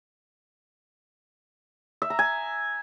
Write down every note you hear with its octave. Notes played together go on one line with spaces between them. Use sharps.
E5
A#5
G#5